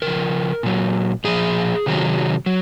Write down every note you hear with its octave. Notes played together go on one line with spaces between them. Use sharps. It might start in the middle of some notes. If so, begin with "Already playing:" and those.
C#3 F3 A#4
A#2 F#3
A#2 F3 G#4
C3 D#3 F#3
F#3